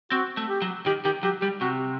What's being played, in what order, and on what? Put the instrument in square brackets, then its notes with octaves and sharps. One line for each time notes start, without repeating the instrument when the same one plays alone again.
[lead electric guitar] C4 [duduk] F#4
[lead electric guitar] A3
[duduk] G4
[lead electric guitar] F#3
[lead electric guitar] D#3 [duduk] G4
[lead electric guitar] D#3 [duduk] G4
[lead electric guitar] F#3 [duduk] G4
[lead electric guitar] G3 [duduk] G4
[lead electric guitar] C3 [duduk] F#4